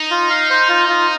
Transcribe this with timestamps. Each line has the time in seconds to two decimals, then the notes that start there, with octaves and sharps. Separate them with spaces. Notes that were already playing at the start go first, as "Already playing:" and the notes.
Already playing: D#4
0.11 F4
0.30 F5
0.50 C5
0.69 F4
0.89 F4